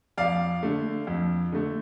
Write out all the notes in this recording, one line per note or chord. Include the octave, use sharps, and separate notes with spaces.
F2 D5 F5
D3 A3
F2
D3 A3